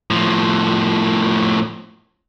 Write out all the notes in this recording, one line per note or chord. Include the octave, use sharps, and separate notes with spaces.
A2 F3